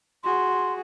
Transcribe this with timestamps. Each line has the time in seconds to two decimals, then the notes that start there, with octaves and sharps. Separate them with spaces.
0.24 F#4 G#4 C6